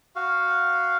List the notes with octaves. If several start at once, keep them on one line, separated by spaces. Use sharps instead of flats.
F#4 F5